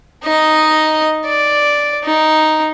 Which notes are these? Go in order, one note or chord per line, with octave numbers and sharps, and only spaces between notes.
D#4 D#5
D5
D#4